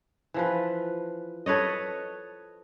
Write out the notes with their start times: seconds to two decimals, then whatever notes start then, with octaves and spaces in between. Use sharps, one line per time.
0.34 E3 F3 B4
1.46 A4 B4 C#5 D#5